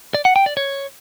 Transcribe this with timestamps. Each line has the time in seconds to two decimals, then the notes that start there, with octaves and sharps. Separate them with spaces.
0.14 D5
0.25 F#5
0.36 G5
0.46 D5
0.57 C#5